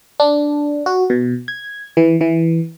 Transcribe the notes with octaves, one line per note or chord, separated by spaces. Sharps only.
D4
F#4
B2
G#6
E3
E3